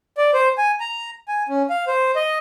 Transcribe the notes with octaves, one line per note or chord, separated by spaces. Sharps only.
D5
C5
G#5
A#5
G#5
C#4
F5
C5
D#5